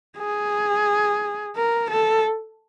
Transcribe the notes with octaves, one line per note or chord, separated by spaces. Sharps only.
G#4
A#4
A4